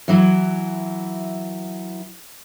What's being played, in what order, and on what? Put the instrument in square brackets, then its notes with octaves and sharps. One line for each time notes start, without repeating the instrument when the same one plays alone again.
[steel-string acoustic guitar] E3 F#3 E4